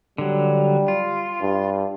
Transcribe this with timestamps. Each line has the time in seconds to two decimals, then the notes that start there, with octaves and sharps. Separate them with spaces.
0.18 D3 F#3 G3
0.88 F4
1.41 G2